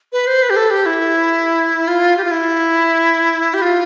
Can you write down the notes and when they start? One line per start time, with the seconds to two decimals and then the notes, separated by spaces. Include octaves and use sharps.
0.12 B4
0.27 C5
0.42 B4
0.50 G4
0.56 A4
0.71 G4
0.86 E4
1.88 F4
2.17 G4
2.24 F4
2.31 E4
3.54 G4
3.62 F4